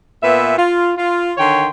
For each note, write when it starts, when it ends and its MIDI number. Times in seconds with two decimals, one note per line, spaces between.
0.23 0.57 46
0.23 0.57 59
0.23 0.57 71
0.23 0.57 76
0.58 0.92 65
0.97 1.33 65
1.38 1.69 50
1.38 1.69 51
1.38 1.69 73
1.38 1.69 79
1.38 1.69 84